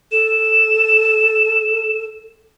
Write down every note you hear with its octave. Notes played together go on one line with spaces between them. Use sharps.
A4 E7